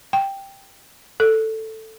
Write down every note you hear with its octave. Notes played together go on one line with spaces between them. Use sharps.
G5
A4